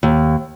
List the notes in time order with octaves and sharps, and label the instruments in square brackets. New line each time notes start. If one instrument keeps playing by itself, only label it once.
[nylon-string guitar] D#2